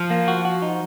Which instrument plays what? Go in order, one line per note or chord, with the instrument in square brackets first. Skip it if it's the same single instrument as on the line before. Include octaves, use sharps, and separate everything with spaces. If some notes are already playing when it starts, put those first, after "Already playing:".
Already playing: [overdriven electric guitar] F3
[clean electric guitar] A#3
F#4
F#4
D#4